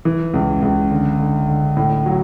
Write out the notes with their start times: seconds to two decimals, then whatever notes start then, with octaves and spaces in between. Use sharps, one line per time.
0.05 E3
0.34 C#2
0.62 C#2
0.91 D3
1.20 D3
1.48 D3
1.77 A2
2.06 F#3